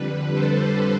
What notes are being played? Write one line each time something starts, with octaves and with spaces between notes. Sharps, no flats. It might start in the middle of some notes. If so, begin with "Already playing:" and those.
Already playing: F2 D3 G3 B4
A4 C5